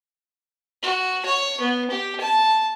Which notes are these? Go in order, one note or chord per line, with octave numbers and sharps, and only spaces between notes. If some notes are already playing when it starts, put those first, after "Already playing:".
F#4
C#5
B3
G4
A5